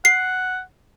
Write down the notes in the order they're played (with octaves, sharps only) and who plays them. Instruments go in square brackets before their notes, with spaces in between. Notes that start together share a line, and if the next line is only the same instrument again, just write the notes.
[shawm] F#5 [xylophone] C7